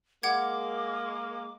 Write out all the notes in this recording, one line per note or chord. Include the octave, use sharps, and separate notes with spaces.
G#3 A#3 F#5 D6 G#6